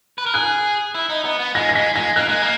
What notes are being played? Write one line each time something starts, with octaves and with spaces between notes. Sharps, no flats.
B4
A#4
G#4 F#6
E4
D#4
B3
B3
G#3 A#6
A#6
G#3 B6
G#3 A#6
A#3 F#6
G#3
A#3